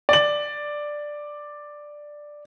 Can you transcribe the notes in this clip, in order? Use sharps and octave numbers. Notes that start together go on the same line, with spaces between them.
D5 F#7